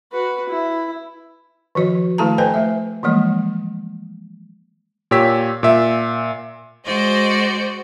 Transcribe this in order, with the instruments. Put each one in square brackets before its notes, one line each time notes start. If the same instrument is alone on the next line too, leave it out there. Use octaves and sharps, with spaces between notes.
[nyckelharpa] F#4 B4
E4
[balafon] D#3 F3 F#4 D#5
D#3 A3 E4 A4 A5 A#5
B4 C5 D#5 G5 G#5
A3 E5
E3 F3 G3 G#3 A#3 D#5
[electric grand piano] A#2 G4 C#5 E6 B6
A#2 E5
[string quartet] G#3 F#4 C5 D5 D#5